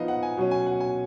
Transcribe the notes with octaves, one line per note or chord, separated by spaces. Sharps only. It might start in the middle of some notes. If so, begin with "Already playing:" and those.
Already playing: F3 B3 D#4 D#5 F5
F#5
G#5
B2 F#3 C#4
G#5
F#5
G#5